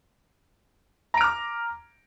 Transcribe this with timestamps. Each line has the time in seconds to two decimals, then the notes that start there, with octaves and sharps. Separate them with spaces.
1.14 A#5
1.17 D7
1.21 F6
1.24 D6